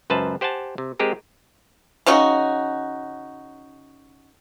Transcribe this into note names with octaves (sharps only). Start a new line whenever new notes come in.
C#2 F#2 B4 C5 A5
G4 C5 F#5 G#5 A5
C3
G#3 C4 G4 G#4 A#4
C#3 C#4 D#4 F#4